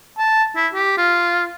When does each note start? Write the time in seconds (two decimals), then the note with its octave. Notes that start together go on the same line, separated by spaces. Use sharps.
0.18 A5
0.56 E4
0.74 G4
0.98 F4